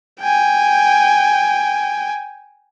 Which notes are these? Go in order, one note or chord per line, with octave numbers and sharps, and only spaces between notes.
G5 G#5